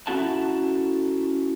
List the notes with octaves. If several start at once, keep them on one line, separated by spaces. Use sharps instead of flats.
C#4 E4 F#4 A4 F#5 A5